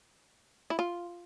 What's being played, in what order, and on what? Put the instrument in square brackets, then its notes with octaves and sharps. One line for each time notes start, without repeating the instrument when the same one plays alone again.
[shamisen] E4
F4